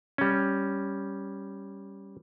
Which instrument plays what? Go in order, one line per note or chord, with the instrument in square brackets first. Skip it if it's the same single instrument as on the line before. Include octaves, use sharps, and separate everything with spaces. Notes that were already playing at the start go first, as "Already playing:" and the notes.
[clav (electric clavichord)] G3 C#4